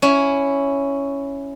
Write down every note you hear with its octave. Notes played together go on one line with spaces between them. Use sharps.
C#4 E4